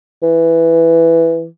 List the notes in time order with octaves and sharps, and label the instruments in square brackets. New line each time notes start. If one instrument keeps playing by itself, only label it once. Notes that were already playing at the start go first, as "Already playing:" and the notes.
[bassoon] E3